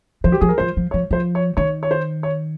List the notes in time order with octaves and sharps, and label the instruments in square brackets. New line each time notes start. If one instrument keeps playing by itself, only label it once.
[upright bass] F3 [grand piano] C5
[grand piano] G4
[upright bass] F3 [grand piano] G#4
[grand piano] A#4
[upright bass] F3 [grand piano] C5
[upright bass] F3
[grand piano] C#5
[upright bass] F3
[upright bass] F3 [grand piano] C5
[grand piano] C#5
[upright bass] D#3 [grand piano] C#5
[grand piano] C#5
C5
C#5